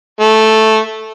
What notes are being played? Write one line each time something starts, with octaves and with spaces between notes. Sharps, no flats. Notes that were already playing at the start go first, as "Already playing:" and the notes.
A3